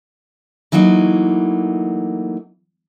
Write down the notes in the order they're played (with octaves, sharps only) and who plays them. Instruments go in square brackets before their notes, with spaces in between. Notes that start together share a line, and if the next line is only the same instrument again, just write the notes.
[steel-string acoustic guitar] E3 F#3 A3 A#3 D#4